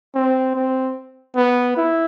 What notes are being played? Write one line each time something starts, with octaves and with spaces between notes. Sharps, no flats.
C4
C4
B3
E4